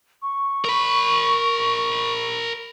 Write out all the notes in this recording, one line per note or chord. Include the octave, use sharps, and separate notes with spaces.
C#6
A#4 B5